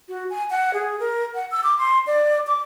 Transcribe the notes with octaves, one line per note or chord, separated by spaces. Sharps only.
F#4
G#5
F#5
G#4
A#4
F#5
E6
D6
C6
D5
D6